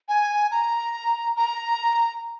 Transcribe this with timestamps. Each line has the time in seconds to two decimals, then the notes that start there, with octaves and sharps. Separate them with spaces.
0.09 G#5
0.51 A#5
1.37 A#5